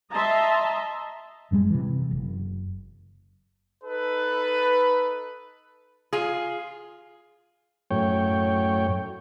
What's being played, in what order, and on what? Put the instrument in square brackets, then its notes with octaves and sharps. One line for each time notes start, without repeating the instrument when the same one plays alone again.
[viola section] D#5 E5 A5 A#5 C6
[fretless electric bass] G1 F#2 G3 G#3
C3 E3
F#1
[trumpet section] D#4 A4 B4
[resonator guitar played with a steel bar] F4 G#4
[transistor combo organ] F#2 A2 C#5 G5